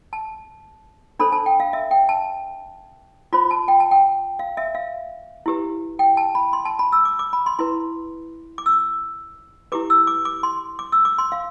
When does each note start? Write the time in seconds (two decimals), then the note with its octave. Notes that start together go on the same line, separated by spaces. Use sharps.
0.13 A5
1.19 D4 A4 C5 B5
1.32 A5
1.46 G5
1.60 F5
1.73 E5
1.91 G5
2.09 A5
3.33 F4 C5 B5
3.51 A5
3.68 G5
3.80 A5
3.91 G5
4.39 F5
4.57 E5
4.75 F5
5.46 E4 G4 B4
5.99 G5
6.17 A5
6.35 B5
6.53 C6
6.65 A5
6.79 B5
6.92 E6
7.05 D6
7.19 D6
7.33 B5
7.46 C6
7.59 E4 B4 C6
8.58 D6
8.66 E6
9.72 E4 G4 B4 D6
9.90 E6
10.07 D6
10.25 D6
10.43 C6
10.79 D6
10.92 E6
11.05 D6
11.18 C6
11.32 F5